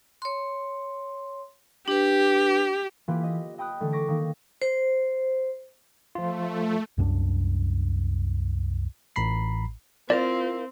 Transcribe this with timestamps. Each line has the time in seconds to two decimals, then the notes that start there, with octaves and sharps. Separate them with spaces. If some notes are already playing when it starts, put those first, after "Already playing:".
0.22 C#5 C6
1.88 D4 G4 B4
3.08 E3 A#3 F4 G4 B4
3.24 D#5
3.58 D#5 G5 B5 D#6 F#6
3.80 D3 E3 A3
3.92 C#6 D6 A#6 B6 D7
4.08 D#3 A#3
4.62 C5
6.15 F3 A3 F4
6.98 C2 F#2 C#4 D4
9.16 A1 A2 A#5 B5 C7
10.10 C4 E4 F4 A#4 D5 F5